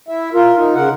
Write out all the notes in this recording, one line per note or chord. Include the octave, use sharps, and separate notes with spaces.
E4 E5
F4 A#4
D#4
C#3 A#4 F#5